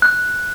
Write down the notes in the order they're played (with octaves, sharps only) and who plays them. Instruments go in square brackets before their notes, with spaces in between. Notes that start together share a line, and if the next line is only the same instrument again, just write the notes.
[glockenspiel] F#6